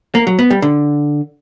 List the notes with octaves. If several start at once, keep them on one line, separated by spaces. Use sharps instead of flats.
A#3
F#3
B3
G3
D3